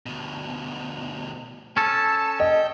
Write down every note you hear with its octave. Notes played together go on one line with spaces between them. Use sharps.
D2 B2
C#4 A4 A5
D#5 G5